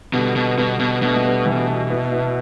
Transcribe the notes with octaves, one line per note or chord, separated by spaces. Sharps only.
B2 D3 G3
B2
B2 G3 B3
B2
B2 A3 D4
A3
G3 B3
E3 A3
B3 E4
B3 E4